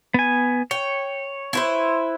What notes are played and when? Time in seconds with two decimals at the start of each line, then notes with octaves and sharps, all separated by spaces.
0.14 B3 G#5
0.71 C#5 G5
1.53 E4 B4 C5